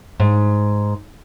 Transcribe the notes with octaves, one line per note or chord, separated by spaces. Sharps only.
G#2